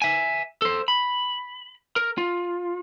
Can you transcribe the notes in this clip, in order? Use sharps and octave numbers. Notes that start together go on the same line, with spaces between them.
E5 G#5
A4 C5
B5
A#4
F4